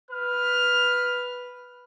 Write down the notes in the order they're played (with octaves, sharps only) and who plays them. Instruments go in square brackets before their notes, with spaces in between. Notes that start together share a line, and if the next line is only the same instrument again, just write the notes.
[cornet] B4 [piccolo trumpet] F6